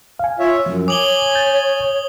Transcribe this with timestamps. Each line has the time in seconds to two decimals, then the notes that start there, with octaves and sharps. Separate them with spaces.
0.19 F5 G#5
0.39 F4 C#5 E5
0.66 F#2 F3 F#3
0.88 C#5 G#5 D6 D#6 F#7 G7
1.35 G6 A6